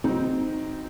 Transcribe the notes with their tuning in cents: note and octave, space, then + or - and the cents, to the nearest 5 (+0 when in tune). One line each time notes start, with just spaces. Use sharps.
F#3 +0 C4 -10 D#4 +0